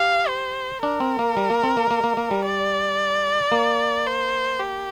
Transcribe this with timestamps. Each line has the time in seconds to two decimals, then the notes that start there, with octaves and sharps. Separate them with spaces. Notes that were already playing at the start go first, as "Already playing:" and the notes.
Already playing: G4 F5
0.28 C5
0.82 D4 A#4
1.00 C4
1.19 A#3
1.37 G3
1.50 A#3
1.64 C4
1.77 A#3
1.91 A#3
2.04 A#3
2.17 A#3
2.31 G3
2.45 D5
3.52 A#3
4.06 C5
4.59 G4